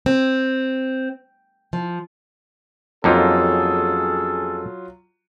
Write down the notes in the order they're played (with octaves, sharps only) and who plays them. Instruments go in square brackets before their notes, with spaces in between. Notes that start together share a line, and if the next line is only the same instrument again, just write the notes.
[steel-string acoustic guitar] C4
F3
[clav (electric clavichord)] F2 A#3 D#4 [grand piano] F#3 F4 [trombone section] C#4 G#4 A4